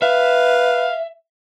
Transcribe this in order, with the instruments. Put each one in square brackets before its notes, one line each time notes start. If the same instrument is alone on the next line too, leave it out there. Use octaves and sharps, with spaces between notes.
[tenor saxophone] B4 [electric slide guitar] E5 [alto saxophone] F5